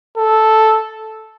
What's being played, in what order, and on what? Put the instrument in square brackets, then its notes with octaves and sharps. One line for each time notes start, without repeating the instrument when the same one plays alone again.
[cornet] A4